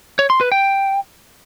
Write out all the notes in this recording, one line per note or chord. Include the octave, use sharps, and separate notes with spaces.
C#5
C6
B4
G5